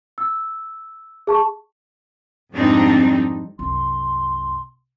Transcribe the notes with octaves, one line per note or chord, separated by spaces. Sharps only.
E6
G#4 A5 C#6
F2 G#2 G3 C4 D4 D#4
C2 F#2 C6